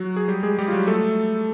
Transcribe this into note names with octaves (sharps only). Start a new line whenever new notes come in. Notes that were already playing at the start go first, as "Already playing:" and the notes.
Already playing: F#3 F#4
G#4
G3 G4
G#3 G#4
G3 G4
F4
F#3 F#4
A3 A4